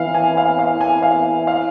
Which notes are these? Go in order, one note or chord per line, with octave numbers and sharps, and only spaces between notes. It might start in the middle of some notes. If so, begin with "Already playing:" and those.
Already playing: E3 F5
G#5
F5
F5
G#5
F5
F5